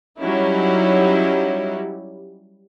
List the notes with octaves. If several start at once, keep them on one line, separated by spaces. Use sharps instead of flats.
F#3 G3 C#4 D#4 E4